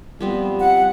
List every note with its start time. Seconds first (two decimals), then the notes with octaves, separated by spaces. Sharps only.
0.21 F3 G3 B3 C4
0.60 F#5